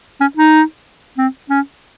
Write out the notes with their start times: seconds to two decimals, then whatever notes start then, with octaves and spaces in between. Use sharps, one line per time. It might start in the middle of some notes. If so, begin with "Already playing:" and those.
0.21 C#4
0.37 D#4
1.18 C4
1.50 C#4